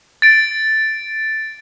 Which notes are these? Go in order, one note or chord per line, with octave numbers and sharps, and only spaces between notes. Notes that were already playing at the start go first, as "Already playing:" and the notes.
A6 D7